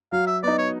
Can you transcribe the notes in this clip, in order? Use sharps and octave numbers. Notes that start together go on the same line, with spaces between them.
F#3 F5
E5
B3 D#4 D5
C#5